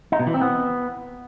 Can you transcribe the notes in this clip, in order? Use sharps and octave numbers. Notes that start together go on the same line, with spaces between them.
D#4
B2
E3
C4
B3